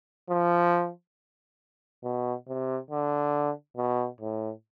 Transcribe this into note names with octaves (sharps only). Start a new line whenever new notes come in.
F3
B2
C3
D3
B2
A2